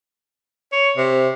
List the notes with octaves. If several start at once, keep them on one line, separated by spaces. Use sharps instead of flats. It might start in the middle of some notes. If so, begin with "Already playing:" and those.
C#5
C3